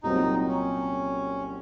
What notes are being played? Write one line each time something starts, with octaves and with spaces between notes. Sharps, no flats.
C2 A#2 F#3 C4 D#4
C#4